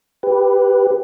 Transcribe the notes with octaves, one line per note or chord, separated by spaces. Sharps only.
G4 B4